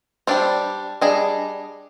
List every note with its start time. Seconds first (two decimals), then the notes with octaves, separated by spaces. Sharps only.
0.27 G3 D4 G4 C5
1.01 G3 D4 G#4 D#5